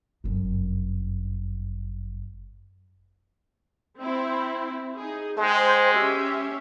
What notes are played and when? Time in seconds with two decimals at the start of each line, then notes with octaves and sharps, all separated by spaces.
0.24 G1 F#2
3.98 C4 E4
4.96 D#4 G#4
5.38 G#3 C5 G5
5.94 C#4 G4 E5